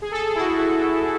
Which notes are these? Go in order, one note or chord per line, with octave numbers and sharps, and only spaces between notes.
G#4
A4
G#4
E4
F#4